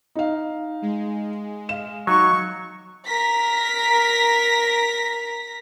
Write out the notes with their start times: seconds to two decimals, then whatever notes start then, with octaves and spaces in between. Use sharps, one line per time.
0.15 D#4 F5
0.82 G#3
1.69 F5 E7
2.07 F#3 D#4 C#6
3.07 A#4 A#6 B6